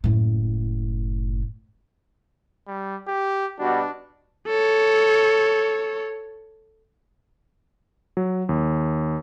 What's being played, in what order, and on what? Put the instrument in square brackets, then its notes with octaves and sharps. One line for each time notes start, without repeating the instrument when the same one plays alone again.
[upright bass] F#1 A2
[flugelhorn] G3
G4
[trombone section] B2 G3 F#4 [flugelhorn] D4
[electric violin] A4 C#5
[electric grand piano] F#3
D#2